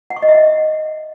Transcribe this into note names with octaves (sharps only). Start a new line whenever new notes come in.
F#5
C#6
D#5
E5
F#5